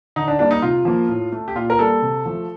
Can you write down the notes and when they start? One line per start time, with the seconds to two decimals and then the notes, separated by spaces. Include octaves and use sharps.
0.16 D3 D#4
0.28 D4
0.39 G3 A#3 D4
0.51 D#4
0.62 C3 F4
0.85 F3 A#3
1.09 A2
1.32 A3
1.48 G4
1.55 A#2 F4
1.70 A#4
1.79 G3 A#3 A4
2.02 C3
2.26 F3 A3